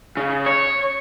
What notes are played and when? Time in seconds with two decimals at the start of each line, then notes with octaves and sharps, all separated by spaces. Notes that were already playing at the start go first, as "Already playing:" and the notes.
0.17 C#3
0.46 C#5